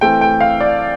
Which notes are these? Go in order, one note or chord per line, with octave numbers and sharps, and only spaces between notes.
E3 A3 C4 G5
G5
F5
D5